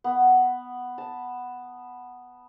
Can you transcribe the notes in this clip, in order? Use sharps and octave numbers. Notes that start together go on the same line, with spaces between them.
B3
A5